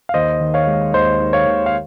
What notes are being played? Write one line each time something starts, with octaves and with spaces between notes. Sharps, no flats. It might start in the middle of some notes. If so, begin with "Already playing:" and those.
F5
D#2 C5 D#5
D#3
C#5 F5
G#3
D#2 C5 D#5
D#3
C#5 F5
D#2
F5